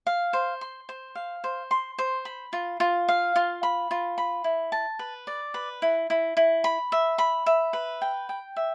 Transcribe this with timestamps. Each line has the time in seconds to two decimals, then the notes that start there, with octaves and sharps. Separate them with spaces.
0.07 F5
0.33 C5
0.61 C6
0.89 C5
1.15 F5
1.44 C5
1.71 C6
1.98 C5
2.25 B5
2.53 F4
2.80 F4
3.08 F5
3.36 F4
3.63 B5
3.91 F4
4.18 B5
4.44 E4
4.72 A5
4.99 B4
5.27 D5
5.54 B4
5.82 E4
6.10 E4
6.37 E4
6.64 B5
6.92 E5
7.18 B5
7.46 E5
7.73 B4
8.02 G5
8.29 G5
8.56 E5